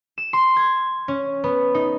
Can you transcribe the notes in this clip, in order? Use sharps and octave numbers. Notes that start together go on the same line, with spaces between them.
E7
C6
G#6
C#4
B3
D#4